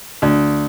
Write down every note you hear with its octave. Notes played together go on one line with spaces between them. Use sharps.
D2